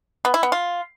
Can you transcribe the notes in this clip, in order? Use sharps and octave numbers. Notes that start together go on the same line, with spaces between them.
B3
E4
B3
F4